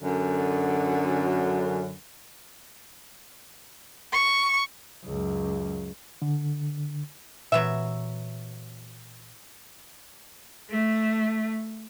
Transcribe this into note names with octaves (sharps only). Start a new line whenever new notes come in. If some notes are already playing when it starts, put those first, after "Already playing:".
F#2 D3
C#6
C#2 F#2
D3
A#2 E3 F#3 B3 E5
A3